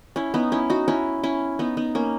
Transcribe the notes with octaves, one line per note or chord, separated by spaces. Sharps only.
C#4 E4
B3 D#4
C#4 E4
D#4 F#4
C#4 E4
C#4 E4
B3 D#4
B3 D#4
A#3 C#4